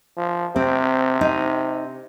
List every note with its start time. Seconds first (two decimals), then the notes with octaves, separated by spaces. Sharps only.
0.17 F3
0.56 C3 C4
1.21 D#4